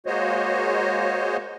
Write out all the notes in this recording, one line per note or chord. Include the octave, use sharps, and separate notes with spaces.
G#3 A#3 F#4 C5 C#5 D#5